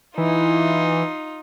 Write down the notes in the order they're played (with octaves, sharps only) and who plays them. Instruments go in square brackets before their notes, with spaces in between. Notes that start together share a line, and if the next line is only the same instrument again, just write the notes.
[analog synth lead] E3 [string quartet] D#4 F4